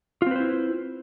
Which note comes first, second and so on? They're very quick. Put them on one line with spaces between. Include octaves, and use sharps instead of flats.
F4 C4 B4 C5 E4